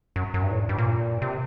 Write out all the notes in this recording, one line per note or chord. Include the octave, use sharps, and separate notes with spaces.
F#2
F#2
G2
A2
G2
A#2
C3